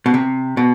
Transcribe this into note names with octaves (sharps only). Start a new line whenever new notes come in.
B2
C3
B2